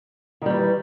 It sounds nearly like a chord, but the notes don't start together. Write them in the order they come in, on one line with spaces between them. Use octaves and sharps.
D#3 G3 E3